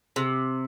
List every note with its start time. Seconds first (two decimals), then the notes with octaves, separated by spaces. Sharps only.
0.16 C3